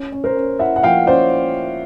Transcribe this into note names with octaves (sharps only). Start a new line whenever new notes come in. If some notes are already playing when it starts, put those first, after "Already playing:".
Already playing: C#4
C#4
A#4 C5
C#4
E4 E5 F#5
F#5
F3 F5 G5
C#4 C5 D5